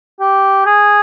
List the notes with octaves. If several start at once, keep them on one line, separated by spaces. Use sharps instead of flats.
G4
G#4